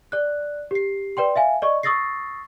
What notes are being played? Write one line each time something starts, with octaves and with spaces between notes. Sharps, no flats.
D5 F#6
G4 C7
B4 D5 G5 C6
E5 F5 G#5
D5 D#5 C#6
C#6 D#6 E6 A6 A#6 C7